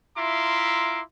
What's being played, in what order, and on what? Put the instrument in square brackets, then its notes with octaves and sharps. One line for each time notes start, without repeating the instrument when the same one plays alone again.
[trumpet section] E4 F4 E5 A#5 C6 D6